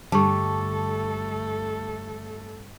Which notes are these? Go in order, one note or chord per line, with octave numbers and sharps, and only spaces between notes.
G2 D3 G3 A3 A4 A5 C#6